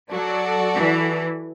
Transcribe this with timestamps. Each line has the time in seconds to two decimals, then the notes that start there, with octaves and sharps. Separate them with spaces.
0.10 F#3 F#4 A4 D5
0.77 E3